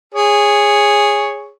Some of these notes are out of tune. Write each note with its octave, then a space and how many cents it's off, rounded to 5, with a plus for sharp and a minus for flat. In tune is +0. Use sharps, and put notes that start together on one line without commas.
G#4 -10 C#5 +0